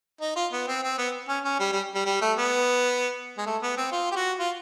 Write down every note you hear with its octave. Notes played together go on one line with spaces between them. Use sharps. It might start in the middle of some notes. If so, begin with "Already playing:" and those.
D#4
F4
B3
C4
C4
B3
C#4
C#4
G3
G3
G3
G3
A3
B3
G#3
A3
B3
C4
F4
G4
F#4
F4